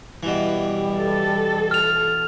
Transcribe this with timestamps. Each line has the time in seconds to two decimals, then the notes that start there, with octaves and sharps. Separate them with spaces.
0.23 B2 E3 G3
0.96 A4
1.71 F6 F7